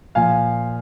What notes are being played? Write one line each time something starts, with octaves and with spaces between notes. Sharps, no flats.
A#2 F3 F5 G#5